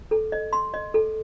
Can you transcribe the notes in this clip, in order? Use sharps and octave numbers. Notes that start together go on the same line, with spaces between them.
A4
D#5
C6
D#5
A4